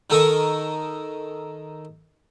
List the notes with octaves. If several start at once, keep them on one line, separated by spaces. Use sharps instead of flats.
D#3 D#4 A4 A#4 D#5 C#6